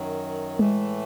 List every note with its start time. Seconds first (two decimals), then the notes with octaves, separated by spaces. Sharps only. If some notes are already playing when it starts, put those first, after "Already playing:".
Already playing: F#2 D#3 F#3
0.59 A2 E3 G#3 A3